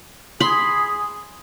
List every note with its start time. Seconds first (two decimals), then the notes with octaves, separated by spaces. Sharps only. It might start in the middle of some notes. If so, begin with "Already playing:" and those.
0.41 G#4 B5 C6